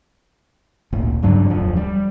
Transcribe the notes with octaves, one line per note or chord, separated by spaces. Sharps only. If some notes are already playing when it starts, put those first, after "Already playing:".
G#1 D2 A#2
G2 C#3 F#3 D4
D1 F2 F3
G3